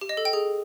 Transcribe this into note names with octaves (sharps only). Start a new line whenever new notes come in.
G4
D#5
A4
G5
G#4